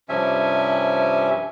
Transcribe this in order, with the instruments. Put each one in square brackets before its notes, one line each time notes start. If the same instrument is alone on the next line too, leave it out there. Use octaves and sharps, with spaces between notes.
[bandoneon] G2 C3 F3 C#4 E5 G#5